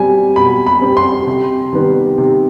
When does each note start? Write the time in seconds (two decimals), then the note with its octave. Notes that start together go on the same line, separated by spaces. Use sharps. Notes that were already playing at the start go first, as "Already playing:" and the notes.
Already playing: B2 G3 C4 G#5
0.36 B2 B5
0.66 B5
0.81 G3 C4
0.97 C6
1.27 C3
1.73 D#3 G3 B3
2.18 C3